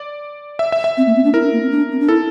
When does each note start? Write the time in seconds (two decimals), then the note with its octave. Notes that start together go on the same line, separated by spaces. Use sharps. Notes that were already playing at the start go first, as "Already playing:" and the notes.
Already playing: D5
0.59 E5
0.72 E5
0.84 E5
0.97 C4
1.07 A#3
1.16 C4
1.24 D4
1.33 E4 A#4
1.43 D4
1.53 A#3
1.62 C4
1.71 D4
1.92 C4
2.00 D4
2.09 E4 A4